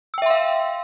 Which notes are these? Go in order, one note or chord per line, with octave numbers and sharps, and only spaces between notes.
E5 F5 G5 C6 E6